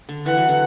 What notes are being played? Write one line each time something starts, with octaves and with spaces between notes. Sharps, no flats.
D3
E3 F#5
F#3
D3